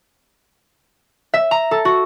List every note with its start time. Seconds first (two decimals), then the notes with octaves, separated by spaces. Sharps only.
1.34 E5
1.51 A#5
1.71 A4
1.85 F#4